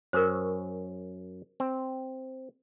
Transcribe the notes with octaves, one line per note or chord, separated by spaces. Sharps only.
F#2 C#4 A#4 C5
C4